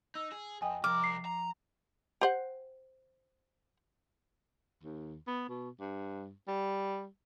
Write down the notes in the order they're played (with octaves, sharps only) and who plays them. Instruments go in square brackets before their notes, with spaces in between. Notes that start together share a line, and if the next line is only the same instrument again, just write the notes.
[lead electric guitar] D#4 [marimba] E6
[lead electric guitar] G#4
[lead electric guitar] F2 [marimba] D#5 G5 D#6 [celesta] G#5
[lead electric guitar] C2 A#4 [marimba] F3 [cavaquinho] D6 [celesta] F6
[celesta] C7
[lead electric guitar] A#5
[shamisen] G4 C5 F#5
[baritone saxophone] D#2
B3
B2
G2
G3